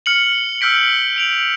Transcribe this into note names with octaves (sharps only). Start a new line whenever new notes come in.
F6 C#7 F#7
E6 F6 G6 B6 D7
D7 F7 F#7